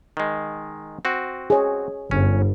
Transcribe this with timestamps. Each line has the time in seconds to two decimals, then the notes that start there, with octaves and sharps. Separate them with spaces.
0.17 D#3 G#3
1.05 C4 F#4
1.50 G#4 C#5
2.11 G1 C#4